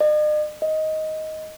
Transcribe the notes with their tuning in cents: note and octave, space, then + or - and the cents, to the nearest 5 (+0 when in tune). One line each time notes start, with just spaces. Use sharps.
D#5 -45
D#5 +10